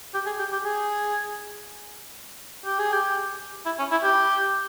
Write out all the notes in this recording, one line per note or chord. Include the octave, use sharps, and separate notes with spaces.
G4
G#4
G4
G4
G#4
G4
G#4
G4
E4
C#4
E4
G4